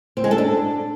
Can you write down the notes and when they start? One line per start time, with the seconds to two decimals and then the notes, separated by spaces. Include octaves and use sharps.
0.17 C4
0.24 G#3
0.31 A4
0.38 D4